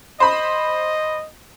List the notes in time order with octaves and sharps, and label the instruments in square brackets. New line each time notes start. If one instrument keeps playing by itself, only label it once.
[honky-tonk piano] C5 B5 [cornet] D#5